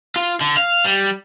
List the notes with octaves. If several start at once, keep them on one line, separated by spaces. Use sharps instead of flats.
F4
D3
F5
G3